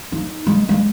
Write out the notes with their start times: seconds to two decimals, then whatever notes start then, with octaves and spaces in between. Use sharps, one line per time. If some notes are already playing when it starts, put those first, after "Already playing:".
0.12 D#4
0.47 G#3
0.69 G#3